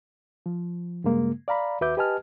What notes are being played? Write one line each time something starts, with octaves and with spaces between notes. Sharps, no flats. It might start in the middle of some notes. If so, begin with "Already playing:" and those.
F3
G2 C#3 G#3 A#3
D5 F5 A#5 B5
D#2 F#4 B4 E5 D6 G6
G4 B4 D#5 G#5 A5 F6